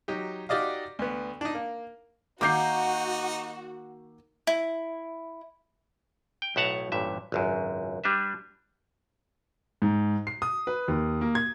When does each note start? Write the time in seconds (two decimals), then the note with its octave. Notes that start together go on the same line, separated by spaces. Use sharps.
0.08 F#3 D#4 G4
0.49 D#4 F#4 G4 D5 D#5 F5
0.99 D2 B3
1.41 D4 D#4
1.55 A#3
2.41 D#3 A#3 D#4 F#4 D6 G6 C7
4.47 E4
6.42 G5
6.56 B1 A2 E5 F#5 A5 A#5
6.92 A1 G2 A#2 E5
7.32 G#1 C#2 F#2
8.04 G3 D4 B4 E5
9.82 G#2
10.27 C7
10.42 D#6
10.67 B4
10.88 D#2
11.21 A#3
11.35 G#6